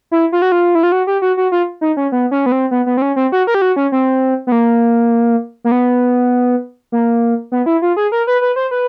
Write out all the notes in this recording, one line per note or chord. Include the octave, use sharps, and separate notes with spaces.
E4
F4
F#4
F4
E4
F4
F#4
G4
F#4
F#4
F4
D#4
C#4
B3
C#4
B3
C4
B3
B3
C4
C#4
C4
F#4
A#4
G4
F#4
C#4
C4
B3
A#3
A#3
B3
A#3
B3
E4
F4
G#4
A#4
B4
B4
C5
B4